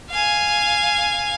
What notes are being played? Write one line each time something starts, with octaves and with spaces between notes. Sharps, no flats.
F5 G#5